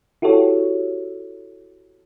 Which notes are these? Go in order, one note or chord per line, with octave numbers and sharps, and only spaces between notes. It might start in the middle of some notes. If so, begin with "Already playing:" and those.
E4 F#4 G4 A4 C#5